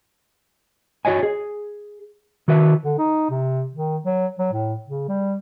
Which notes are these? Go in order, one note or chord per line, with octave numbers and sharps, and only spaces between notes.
F#4 C#5 D#5 G#5
G#4
D#3 F#4 B4 E5
D3
D#4
C3
D#3
F#3
F#3
A2
C#3
G3